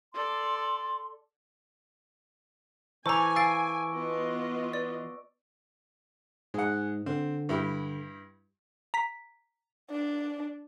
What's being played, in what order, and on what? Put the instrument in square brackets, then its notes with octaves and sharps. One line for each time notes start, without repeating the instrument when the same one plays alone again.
[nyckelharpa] A4 D5 [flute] C6
[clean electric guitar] E3 A4 [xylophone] C5 A#5 [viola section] G#5 [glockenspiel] C#6 D6
[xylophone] F5 A6 [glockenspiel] E6 D7
[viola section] B3 F4 D#5
[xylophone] D5
[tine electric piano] G#2 [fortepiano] G#3 F#5
[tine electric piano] D3 [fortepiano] C4
[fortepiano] G2 E4 G4
[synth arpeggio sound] A#5 B6
[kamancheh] D4